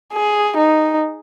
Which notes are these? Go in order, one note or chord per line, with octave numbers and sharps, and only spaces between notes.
G#4
D#4